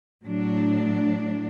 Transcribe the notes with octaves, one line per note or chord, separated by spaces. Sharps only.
A2 F#3 D4